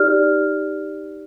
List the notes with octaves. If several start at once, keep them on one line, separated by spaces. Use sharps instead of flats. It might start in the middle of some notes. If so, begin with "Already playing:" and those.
Already playing: D#4 G4 D5 F6